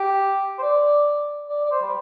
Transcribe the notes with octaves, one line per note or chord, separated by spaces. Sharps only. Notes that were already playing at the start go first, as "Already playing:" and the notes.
Already playing: G4
C5
D5
D5
D5
C5
G3